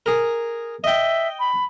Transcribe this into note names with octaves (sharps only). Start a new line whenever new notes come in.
G#4 A#4
D#5 E5 G5
B5